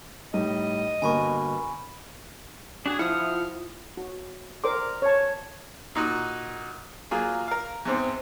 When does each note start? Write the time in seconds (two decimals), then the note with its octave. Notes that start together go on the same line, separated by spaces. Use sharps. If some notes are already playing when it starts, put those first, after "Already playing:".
0.34 A2 G3 D#4 D#5
1.02 G1 B2 A#3 G#5 B5 C#6
2.86 D4 F#4 G#4
2.99 F3 E4 F4 F#5 D#6 F6
3.97 F#4
4.64 A#4 C5 D5 C6 D6
5.02 C#5 A5
5.95 A#2 D#4 F#4
7.11 F#3 A#3 F4 G#4
7.48 A#4 F5
7.85 E2 G#2 C4